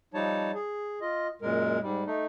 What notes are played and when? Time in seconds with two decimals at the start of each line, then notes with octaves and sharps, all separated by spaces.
0.14 F3 G3 D#4 C#5 A5
0.54 G#4
1.01 F4 D#5
1.42 F#2 A#2 G#3 A#4
1.82 G#2 G3
2.07 A3 D#4